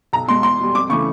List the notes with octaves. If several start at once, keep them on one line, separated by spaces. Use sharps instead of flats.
B1 A#5
B2 G#3 C6
E2 C6
B2 G3
F2 D6
C#3 E3 A3 C#6